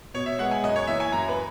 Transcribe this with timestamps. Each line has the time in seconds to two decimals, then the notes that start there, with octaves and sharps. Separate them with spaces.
0.14 B2 C#5
0.26 E5
0.39 G#3 B3 F#5
0.51 G#5
0.64 F#2 D#5
0.76 C#5
0.87 E3 A#3 E5
1.00 G#5
1.12 F#2 A#5
1.29 B4